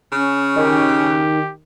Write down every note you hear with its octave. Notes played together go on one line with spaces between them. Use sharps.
C#3 C#4
D#3 G4